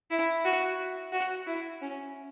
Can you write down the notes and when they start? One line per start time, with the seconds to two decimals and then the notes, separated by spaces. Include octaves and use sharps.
0.11 E4
0.45 F#4
1.12 F#4
1.46 E4
1.82 C#4